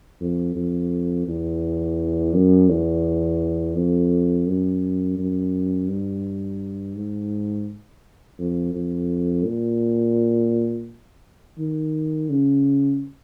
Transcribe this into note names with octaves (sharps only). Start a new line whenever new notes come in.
F2
F2
E2
F#2
E2
F2
F#2
F#2
G2
G#2
F2
F2
A#2
D#3
C#3